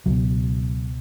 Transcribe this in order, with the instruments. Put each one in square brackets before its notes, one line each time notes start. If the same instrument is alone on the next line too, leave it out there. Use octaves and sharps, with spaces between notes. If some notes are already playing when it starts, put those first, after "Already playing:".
[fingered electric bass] C#2 B2 F#3